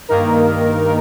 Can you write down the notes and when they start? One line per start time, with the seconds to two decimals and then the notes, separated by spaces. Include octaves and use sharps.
0.09 G2 D#3 A#3 D#4 A#4